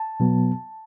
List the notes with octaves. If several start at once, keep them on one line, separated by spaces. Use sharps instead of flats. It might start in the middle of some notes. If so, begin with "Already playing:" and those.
Already playing: A5
B2 F#3 B3